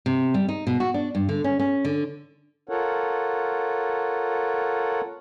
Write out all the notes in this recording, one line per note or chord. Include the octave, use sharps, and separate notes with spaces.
C3
G3
D#4
B2
F#4
D4
G2
D3
C#4
C#4
D3
F4 A4 A#4 C#5 F#5